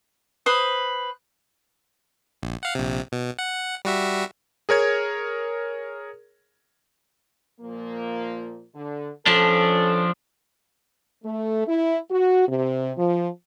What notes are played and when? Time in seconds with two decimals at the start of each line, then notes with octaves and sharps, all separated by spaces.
0.46 B4 C5 D#6
2.43 A#1
2.63 F5 F#5
2.75 A#1 C3
3.12 B2
3.39 F#5
3.85 G3 F#4 E5
4.69 G#4 A#4 C#5 G#6
7.61 A#2 F3 A#3
8.74 D3
9.26 F3 C#4 D4 A4
11.24 A3
11.67 E4
12.11 F#4
12.48 C3
12.97 F3